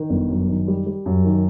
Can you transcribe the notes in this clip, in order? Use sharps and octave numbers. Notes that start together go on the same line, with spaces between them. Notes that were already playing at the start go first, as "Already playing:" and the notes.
Already playing: D#3
G1
F#2
D#3
G3
G3
F#2
D#3